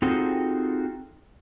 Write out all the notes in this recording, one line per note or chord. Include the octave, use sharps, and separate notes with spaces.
C4 D#4 F4 F#4 G#4 A4